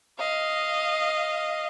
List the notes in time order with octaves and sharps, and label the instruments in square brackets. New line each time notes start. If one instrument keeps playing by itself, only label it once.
[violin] D#5 F5